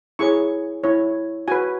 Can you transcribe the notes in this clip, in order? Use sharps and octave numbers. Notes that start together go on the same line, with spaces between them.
E4 G#4 C#5 C#6
E4 C#5
F#4 B4 G#5